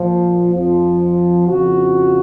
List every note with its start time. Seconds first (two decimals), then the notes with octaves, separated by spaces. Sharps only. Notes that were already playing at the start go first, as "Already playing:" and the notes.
Already playing: A#2 F3
0.54 F2 F3
1.48 F2 C#3 F3 F#4